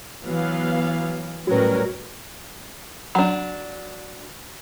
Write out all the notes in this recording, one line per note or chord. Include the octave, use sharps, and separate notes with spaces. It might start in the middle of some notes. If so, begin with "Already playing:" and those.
E3 F#3 B3 F5
A2 F#3 G3 C#4 F#4 A#4 B4
F#3 D4